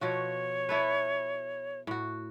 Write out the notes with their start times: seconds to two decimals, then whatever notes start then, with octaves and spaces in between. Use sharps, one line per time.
0.01 B2 F3 F#4 C#5
0.69 E4 A4 B4
1.87 A2 F#4